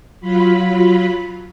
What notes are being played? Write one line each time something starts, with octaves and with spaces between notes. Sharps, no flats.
F#3 F4 B5